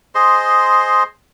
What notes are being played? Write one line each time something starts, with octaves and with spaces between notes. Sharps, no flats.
G#4 C5 D#5 C6